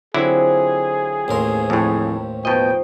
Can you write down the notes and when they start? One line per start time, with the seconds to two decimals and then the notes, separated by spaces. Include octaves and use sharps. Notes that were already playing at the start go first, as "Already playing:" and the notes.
0.14 D3 F#3 C4 E4 F4 G#4
1.28 A1 D#2 A4 A#4 F5 C6
1.70 F2 A2 G4 C#5
2.45 B2 F3 D#4 D#5 G5